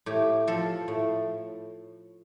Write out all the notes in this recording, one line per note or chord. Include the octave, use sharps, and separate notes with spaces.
A2 G4
F3 A4
A2